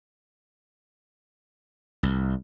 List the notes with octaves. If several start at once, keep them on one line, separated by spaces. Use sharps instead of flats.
C2